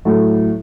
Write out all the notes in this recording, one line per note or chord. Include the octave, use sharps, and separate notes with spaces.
A2 F#3 A3